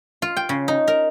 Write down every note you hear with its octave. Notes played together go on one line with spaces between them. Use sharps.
F4
G5
C#3
D#4
A#4